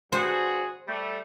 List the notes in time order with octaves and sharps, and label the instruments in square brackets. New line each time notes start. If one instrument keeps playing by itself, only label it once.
[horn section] G2 F#4 G#4 [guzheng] C5
[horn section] G3 A3